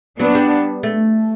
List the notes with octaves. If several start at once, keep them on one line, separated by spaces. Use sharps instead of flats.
F#3 B3 D4
G3
A3